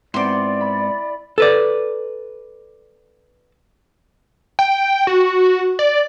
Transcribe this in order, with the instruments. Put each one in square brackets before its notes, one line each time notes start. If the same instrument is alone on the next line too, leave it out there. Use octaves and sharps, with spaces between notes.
[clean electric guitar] G#2 B3 C4 [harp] E4 [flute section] D5 [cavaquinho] C6 D6
[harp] B5
[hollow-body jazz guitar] A4 B4 D5
[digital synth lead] G5
F#4
D5